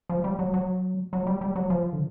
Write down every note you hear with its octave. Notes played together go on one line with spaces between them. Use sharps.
F3
G3
F#3
F#3
F#3
G3
G3
F#3
F3
D3